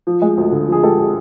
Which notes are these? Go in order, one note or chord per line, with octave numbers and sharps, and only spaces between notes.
F3
G#3
D2
D3
F3 G#4
G#3 G4 A4
G#4